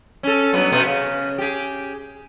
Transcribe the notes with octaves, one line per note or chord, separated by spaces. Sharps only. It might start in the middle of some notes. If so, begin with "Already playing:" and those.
C#4 A4
G2 F#3 B3
B2 B3
C#3
G4 G#4